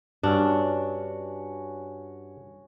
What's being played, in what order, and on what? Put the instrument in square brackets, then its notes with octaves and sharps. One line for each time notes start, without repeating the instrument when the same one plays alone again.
[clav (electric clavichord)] G2 [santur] C#4 F#4 [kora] D4